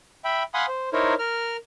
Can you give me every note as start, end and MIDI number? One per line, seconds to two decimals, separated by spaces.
0.25 0.43 76
0.25 0.43 79
0.25 0.43 83
0.54 0.66 77
0.54 0.66 78
0.54 0.66 80
0.54 0.66 83
0.54 0.66 84
0.54 0.66 87
0.68 0.89 72
0.93 1.14 63
0.93 1.14 64
0.93 1.14 70
0.93 1.14 72
0.93 1.14 73
1.19 1.57 70
1.19 1.57 89